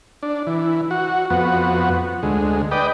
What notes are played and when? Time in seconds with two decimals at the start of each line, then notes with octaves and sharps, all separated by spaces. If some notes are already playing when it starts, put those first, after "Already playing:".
0.23 D4
0.47 E3
0.91 F#4
1.30 F2 B3 F#4
2.23 D2 G#3
2.71 B4 D5 D#5 G5